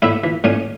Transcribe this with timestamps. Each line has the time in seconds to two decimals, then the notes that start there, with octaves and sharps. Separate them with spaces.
0.02 A2 E4 E5
0.24 E3
0.44 A2 C#4 C#5